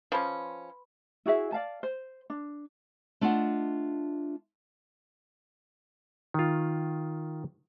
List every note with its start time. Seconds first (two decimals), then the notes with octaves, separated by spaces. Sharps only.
0.12 F3 C#4 B4 B5 C6
1.26 E4 F#4 G#4 E5
1.52 D5 F5 A5
1.83 C5
2.30 D4
3.21 A3 D4 F4 D#5 F#5
6.34 D#3 F4